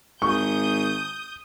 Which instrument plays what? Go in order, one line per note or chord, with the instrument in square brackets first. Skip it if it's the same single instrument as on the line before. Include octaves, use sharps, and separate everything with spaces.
[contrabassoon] G#1 [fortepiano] C#6 [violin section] D#6 G6